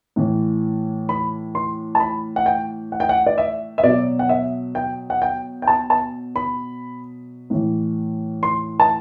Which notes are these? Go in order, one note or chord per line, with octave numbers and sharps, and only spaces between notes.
A2 E3
B5
C6
A5
B5
F#5
G5
F#5
G5
F#5
D5
E5
E5
B2 F#3 D5
F#5
E5
G5
F#5
G5
G5
A5
A5
B5
A2 E3
C6
A5